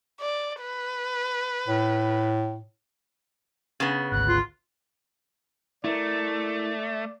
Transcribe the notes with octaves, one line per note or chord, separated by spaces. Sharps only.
D5
B4
A2
C#3 B3
G#1 D2 F#6
F4
A3 E4 A#4 D5